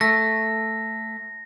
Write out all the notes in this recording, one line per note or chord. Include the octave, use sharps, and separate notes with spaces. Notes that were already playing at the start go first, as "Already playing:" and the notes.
A3 A#6